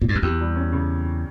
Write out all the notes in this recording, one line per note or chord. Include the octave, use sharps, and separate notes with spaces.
A#2
G2
F#2
E2 G4
G3
C#4
C#3